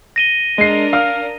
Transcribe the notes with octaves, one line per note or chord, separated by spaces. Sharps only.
A#6 D#7 G7
G#3 D4 A#4 C7
F5 F6